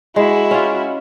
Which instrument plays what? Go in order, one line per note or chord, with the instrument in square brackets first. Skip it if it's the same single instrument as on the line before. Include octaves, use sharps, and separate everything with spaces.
[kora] G#3 [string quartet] E4 F#4
[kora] C#4 F4